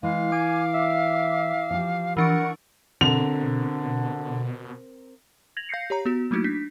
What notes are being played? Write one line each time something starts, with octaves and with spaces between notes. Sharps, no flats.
E3 G#3 F5
G#5 D6
E5
F3 G4
E3 D4 A#4 F#5 C#6
B2 D3 C4 A#4 F7
G#6 A#6 F7 F#7
F5 G6 A#6 C7 C#7
G4 C#5 A#5
B3 F#4
F#3 A3 A#3 D#4 E4 F#4
D4 B6